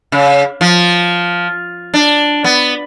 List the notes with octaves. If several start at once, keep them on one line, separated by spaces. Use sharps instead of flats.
C#3
F3
D4
B3